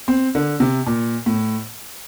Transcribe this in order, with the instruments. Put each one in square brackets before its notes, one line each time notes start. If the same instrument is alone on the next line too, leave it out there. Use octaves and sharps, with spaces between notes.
[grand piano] C4
D3
C3
A#2
A2